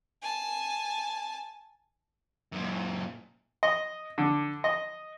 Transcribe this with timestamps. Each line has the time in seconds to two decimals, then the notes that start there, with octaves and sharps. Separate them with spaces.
0.23 G#5 A5
2.52 F#2 A#2
3.63 D#5
4.18 D3
4.64 D#5